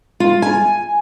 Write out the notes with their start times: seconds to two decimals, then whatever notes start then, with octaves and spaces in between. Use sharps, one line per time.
0.20 F4
0.42 G#5